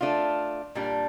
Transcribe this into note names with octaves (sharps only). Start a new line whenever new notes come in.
A3 D4 F4
A#2 G3 D4